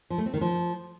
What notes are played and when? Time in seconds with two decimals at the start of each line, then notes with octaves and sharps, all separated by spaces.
0.10 F3
0.18 A3
0.26 C4
0.34 D#3
0.41 F3